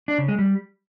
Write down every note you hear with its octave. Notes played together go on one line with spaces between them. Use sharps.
D4
C#3
G#3
G3